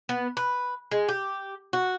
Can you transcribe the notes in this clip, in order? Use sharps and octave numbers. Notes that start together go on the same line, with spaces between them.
B3
B4
G#3
G4
F#4